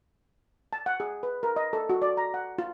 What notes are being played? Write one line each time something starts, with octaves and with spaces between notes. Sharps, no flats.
A5
F#5
G#4
B4
A#4
D#5
A4
F#4
D5
A#5
F#5
F4